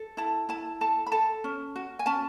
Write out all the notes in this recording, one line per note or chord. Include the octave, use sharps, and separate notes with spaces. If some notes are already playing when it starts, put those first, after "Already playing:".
Already playing: A4
E4 A5
E4 A5
A4 A5
B5
A4 A5
C#4
F#4
G#5
C#4 A5